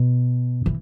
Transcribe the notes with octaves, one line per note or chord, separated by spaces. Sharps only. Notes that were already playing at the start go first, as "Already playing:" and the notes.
Already playing: B2
E3